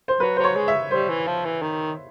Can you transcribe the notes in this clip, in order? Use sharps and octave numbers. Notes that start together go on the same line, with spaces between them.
C5
F#3 B4
F#3 C5
C#5
G#3
E5
G3 C5
E3
F3
E3
D#3